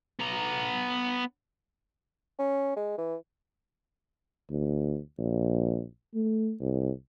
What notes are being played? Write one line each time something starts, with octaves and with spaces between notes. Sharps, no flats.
B3 A#5
C#4
G#3
E3
D2
A#1
A3
C2